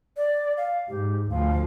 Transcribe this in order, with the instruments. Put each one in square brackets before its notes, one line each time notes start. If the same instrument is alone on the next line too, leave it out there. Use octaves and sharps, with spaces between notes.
[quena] D5
F5
[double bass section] G#2 [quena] G4
[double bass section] D2 F3 [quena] F5